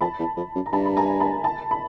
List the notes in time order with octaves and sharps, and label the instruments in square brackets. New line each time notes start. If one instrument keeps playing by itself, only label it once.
[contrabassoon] F2 [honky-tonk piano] A5 B5
[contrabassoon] E2
F2
F#2
[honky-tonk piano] A#5
[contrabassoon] G2 [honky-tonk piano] A5 B5
[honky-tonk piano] B5
G#5 A#5
A5 B5
A5 B5
B5